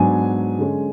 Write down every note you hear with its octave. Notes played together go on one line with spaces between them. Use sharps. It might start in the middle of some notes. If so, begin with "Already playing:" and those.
Already playing: G#2 F#3 B3 D4 G#5
D3 G#3 C#4